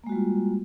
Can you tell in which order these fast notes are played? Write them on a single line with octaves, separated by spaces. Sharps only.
A#3 G#3 F#4 G3 F4